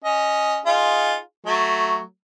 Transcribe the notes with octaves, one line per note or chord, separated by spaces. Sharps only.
C#4 D#5
D#4 F4 G#4
F#3 A3